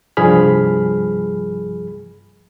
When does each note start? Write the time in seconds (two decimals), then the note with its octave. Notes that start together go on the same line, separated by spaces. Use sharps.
0.17 C2 G2 F3 G#4 B5 F6